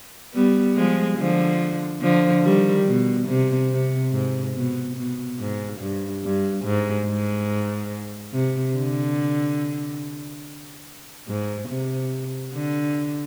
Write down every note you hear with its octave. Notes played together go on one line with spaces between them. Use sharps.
G3 B3
F3 G#3
D3 F3
D3 F3
D#3 G3
B2
C3
C3
G#2
B2
B2
G#2
G2
G2
G#2
G#2
C3
D3
G#2
C3
D3